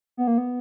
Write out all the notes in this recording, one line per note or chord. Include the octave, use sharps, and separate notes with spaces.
B3
A#3
B3